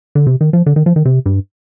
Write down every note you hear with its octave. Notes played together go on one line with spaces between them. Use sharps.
D3
C3
D#3
F3
D3
D#3
F3
D#3
C3
G2